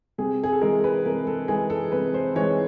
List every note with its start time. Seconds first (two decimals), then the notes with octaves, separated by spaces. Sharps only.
0.18 C3 G#4
0.44 G#4
0.52 A4
0.61 E3 G#3 A#4
0.84 B4
1.05 C3 A#4
1.27 A4
1.48 E3 G#3 G#4
1.70 A4
1.92 C3 B4
2.14 C5
2.35 E3 G#3 C#5